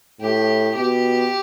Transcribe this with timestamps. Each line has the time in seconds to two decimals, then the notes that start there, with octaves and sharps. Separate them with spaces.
0.21 A2 G4
0.76 B2 G4